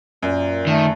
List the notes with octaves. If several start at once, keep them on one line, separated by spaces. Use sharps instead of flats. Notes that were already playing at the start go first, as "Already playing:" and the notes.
F#2 A#2
D#3 A3